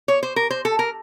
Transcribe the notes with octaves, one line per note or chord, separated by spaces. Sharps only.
C#5
C5
A#4
C5
A4
A#4